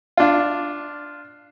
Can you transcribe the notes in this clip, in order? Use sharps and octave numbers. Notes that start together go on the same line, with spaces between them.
D4 F4